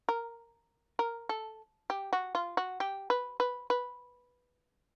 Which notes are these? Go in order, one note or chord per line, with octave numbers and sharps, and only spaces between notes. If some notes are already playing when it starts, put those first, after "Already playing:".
A#4
A#4
A4
G4
F#4
F4
F#4
G4
B4
B4
B4